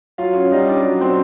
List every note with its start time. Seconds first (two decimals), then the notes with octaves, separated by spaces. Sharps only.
0.18 F#3 F4 F5
0.34 C#4 C#5
0.51 G3 D#4 D#5
0.68 D4 D5
0.84 F#3
1.01 C4 C5